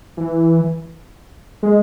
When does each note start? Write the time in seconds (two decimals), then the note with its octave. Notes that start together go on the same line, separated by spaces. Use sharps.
0.17 E3
1.63 G#3